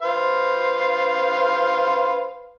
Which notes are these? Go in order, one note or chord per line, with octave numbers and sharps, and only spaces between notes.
B4 C5 F5